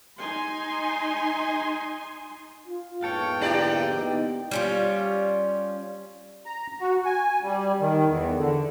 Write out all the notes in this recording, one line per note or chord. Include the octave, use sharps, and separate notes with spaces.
D#4 G#5 C6
F4
A#1 E2 G#2 F4 A4 C#5 G5
D3 A#3 E4 G4 D5 A#5
B3 D#4 G5
G3 C#4 F4
A#5
F#4
G#5
G3
D#3
E2
D3